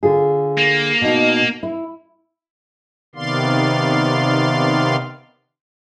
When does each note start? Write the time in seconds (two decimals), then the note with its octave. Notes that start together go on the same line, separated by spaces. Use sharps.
0.03 D3 F4 G#4
0.58 A#3
1.01 B2 D#4
1.63 E4
3.15 C3 D#3 B3 D5 F5 C6